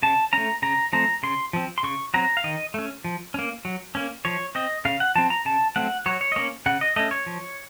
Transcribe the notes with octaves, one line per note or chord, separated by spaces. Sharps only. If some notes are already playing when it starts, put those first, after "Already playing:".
C#3 A5
A3 C#4 A#5
C#3 A#5
F3 A3 C4 A#5
C#3 C6
F3 C4
C6
C#3 C#6
F#3 C4 A#5
F5
D#3 D#5
A3 C#4
F3
A#3 C#4
F#3
A#3 C#4
F3 C#5
C4 D#5
C#3 F5
F#5
F3 C4 A5
A#5
C#3 A5
F#3 A3 C4 F#5
F#3 C#5
C#5
D#5
A#3 C#4 C#5
C#3 F#5
D#5
A3 C#4 D#5
C#5
F3